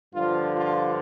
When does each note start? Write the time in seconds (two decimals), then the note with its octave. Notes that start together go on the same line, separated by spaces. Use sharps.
0.14 G2 D3 F3 F4
0.55 F4